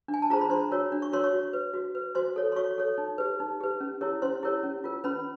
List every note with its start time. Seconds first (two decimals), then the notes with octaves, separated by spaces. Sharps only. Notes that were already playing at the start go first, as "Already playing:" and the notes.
0.08 D4
0.14 G#5
0.22 A5
0.30 F4 G#4 C5 A#5
0.41 B5
0.50 D4 C5 C6
0.72 F#4 A#4 C#5
0.92 D4
1.02 C#6
1.12 F#4 A#4 C#5 C6
1.24 C#5 C#6
1.33 F#4
1.53 B4
1.74 F#4
1.95 B4
2.15 F#4 C5 C6
2.36 A4 C#5
2.52 C6
2.56 F#4 C#5 C#6
2.78 A4 C#5
2.98 D#4
3.18 G4 B4
3.40 D#4
3.61 G4 B4
3.80 C#4
4.01 E4 G4 A#4 C#5
4.22 C#4 C5 C6
4.43 E4 G4 A#4 C#5
4.63 C#4
4.84 F4 A#4
5.04 C#4 B4 B5